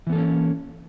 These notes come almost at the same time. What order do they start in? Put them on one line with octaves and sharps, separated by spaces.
E3 B3 A4 A#3 C#4